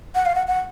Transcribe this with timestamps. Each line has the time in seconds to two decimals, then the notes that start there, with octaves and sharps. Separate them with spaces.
0.15 F#5
0.26 F5
0.35 F#5
0.47 F#5